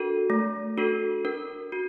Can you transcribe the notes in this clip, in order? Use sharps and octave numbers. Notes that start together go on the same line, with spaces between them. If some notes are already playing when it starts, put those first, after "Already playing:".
Already playing: D4 F#4 A4 A#4
A3
D4 F#4 A4
D4 A#4
F#4